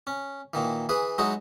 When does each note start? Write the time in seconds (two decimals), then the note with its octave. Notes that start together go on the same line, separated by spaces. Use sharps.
0.07 C#4
0.54 A#2 D#3 E3
0.89 E3 G#4 B4
1.18 F#3 G#3 D#4 E4 F#4